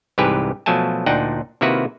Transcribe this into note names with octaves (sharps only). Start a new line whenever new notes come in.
C2 G#2 E3 G4 B4 G#5
B2 F3 F#3 A3 G#5 A5
D2 A#2 D4 D#4 F#5 G5
C3 D#3 A#3 E4 F#4 B4